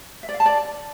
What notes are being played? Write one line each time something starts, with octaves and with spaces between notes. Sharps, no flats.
E5
D5
F5
A5
D5